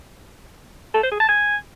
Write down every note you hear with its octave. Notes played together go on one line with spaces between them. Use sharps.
A4
C5
G#4
A5
G#5